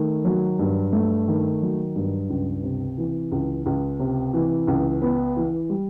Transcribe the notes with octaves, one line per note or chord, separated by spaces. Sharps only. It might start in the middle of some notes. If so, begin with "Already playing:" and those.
Already playing: D#3 A3
F#3
G2
A3
D#3
F#3
G2
C#2
C3
E3
C#2
C#2
C3
E3
C#2
B3
E3
G3